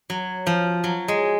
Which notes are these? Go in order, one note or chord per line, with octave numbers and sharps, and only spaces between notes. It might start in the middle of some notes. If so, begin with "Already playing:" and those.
F#3
F3
F#3
G#3